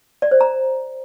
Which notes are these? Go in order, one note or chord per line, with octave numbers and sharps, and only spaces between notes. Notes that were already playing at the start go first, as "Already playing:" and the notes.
D5
C5
A#5